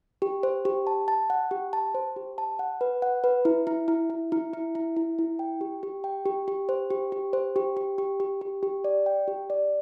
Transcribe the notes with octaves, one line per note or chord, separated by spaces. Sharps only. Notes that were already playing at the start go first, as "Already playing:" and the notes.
G4
C5
G4
A5
A5
F#5
G4
A5
C5
G4
A5
F#5
B4
F#5
B4
E4
E4
E4
E4
E4
E4
E4
E4
E4
G5
G4
G4
G5
G4
G4
C5
G4
G4
C5
G4
G4
G4
G4
G4
G4
D5
G5
G4
D5